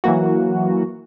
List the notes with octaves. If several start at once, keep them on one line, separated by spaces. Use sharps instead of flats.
E3 F#3 A#3 F#4